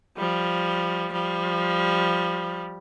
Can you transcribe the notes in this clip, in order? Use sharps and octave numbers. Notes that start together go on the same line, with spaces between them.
F3 G3
F3 G3